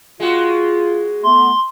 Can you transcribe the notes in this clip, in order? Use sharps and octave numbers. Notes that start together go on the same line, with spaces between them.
G#3 F4 F#4
A3 B3 C6